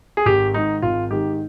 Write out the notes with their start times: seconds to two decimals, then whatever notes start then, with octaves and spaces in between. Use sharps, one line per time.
0.17 G#4
0.26 G#1 G4
0.54 G#2 D#3 D#4
0.82 G#1 F4
1.11 G#2 D#3 G4